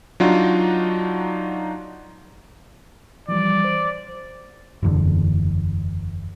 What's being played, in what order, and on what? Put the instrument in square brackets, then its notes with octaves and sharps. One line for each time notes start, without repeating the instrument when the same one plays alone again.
[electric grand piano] F#3 D4 D#4 F4 F#4
[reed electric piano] E3 F3 G3 [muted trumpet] D5
[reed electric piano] C5
[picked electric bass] F#1 E2 D3